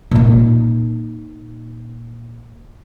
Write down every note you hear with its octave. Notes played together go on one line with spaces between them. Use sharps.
A#2 D#4